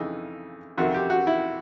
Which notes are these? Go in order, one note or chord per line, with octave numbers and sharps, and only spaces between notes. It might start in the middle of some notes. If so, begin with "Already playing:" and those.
Already playing: F2 C#3 E3 D#4
F2 C3 D#3 F#4
G4
F#4
E4